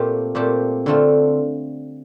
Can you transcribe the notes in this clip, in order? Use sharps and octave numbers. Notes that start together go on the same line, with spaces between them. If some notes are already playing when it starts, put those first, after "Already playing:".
Already playing: A#2 A3 C4 G4
A#2 A3 C4 G4
D3 A3 C4 F4